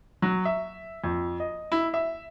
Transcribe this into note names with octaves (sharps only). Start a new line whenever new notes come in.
F#3
E5
F2
D#5
E4
E5